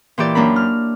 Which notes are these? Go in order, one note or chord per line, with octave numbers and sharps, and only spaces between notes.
A#2 E3 G4 D5
F#2 A#3 D4 A#4 B5
F6